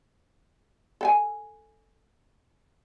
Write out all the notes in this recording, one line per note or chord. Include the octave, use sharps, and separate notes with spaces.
A4 G5 G#5